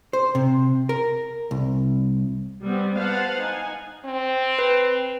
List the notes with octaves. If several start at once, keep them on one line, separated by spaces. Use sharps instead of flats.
C5
C3
A#4
C2
G3 B3 C4
B4 C5 F5 F#5 A5
D#4 G#5
C4
B4